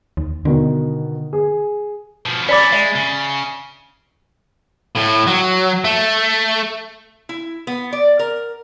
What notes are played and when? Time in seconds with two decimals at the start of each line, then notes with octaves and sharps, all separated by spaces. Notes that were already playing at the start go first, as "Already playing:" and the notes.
0.17 D#2
0.45 B2 D3 D#3
1.33 G#4
2.26 B2 F3
2.49 C#4 E4 D5 B5 D6 A6 B6
2.73 G#3 E5
2.96 C#3
4.95 A2
5.27 F#3
5.85 A3
7.29 E4
7.67 B3
7.93 D5
8.19 A#4